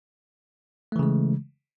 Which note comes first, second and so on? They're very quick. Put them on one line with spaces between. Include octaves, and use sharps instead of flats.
A3 E3 C#3 G#3